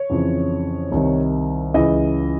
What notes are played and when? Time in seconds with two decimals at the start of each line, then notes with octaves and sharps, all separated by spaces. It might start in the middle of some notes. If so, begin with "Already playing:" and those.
Already playing: C#5
0.10 F2 C#3 E3
0.92 C2 C3 D#3
1.74 C#2 C#3 E3 D#5